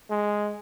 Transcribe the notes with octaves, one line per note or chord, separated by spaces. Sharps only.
G#3